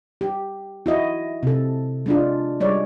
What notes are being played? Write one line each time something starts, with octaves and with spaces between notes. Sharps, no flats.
G4
E4 F#4 D#5
C3 A4
G#3 D4 F4
G3 G#3 C#5 D5